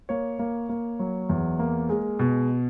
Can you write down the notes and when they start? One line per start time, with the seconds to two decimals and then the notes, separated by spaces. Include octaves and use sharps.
0.09 A#3 C#5
0.39 A#3
0.69 A#3
0.99 F#3
1.29 E2
1.59 A#3
1.89 G#3
2.19 B2